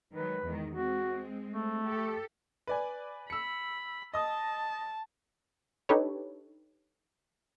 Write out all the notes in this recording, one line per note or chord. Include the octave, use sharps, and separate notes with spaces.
D#3 F#3 G#3 B4
E2 D#3 G#3
G#3 C4 F#4
A3
G4 A4
B4 D5 G#5
B5 E6 C#7
D#5 A5 D#6
D4 D#4 G4 A4 B4 C#5